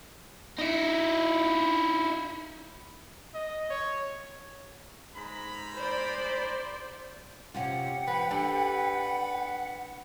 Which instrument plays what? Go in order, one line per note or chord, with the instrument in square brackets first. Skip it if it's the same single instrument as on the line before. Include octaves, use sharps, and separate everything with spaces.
[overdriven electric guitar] D#4 E4
[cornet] D#5
C#5
[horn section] G#2 A#5 B5
[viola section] C5 D5
[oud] C3 C#4 F4 [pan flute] F#5 [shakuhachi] G5
[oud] F3 [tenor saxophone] B4
[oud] D4 G4 A4